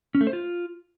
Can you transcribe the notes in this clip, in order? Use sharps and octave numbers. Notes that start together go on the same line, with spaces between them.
C#4
A3
C5
F4